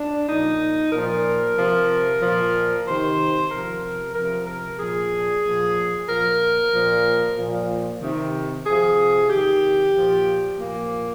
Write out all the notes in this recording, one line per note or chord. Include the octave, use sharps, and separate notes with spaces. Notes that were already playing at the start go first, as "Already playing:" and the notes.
Already playing: D4
A#2 F3 D#4
A#2 F3 A#4
C3 F3
A#2 F3
C3 D#3 C5
C3 F3 A#4
C3 F3 A#4
A#4
A#2 F3 G#4
A#2 F3
A#2 F3 A#4
A#2 F3
A#2 F3
C3 D#3
C3 F3 G#4
C3 D#3 G4
A#2 F3
A#2 F3 A#3